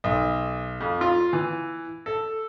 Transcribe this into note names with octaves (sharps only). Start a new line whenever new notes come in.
B1
F2
F4
E3
A4